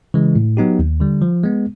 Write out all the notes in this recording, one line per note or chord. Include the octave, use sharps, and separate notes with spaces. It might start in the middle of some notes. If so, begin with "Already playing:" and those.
C#3 E3 G#3
A2
F#3 B3 D#4 G4
D#2
D3 G3
F3
G#3 B3